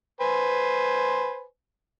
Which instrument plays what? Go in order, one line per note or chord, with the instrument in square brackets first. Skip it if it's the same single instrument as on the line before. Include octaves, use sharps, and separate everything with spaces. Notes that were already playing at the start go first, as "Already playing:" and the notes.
[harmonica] B4 C5 G#5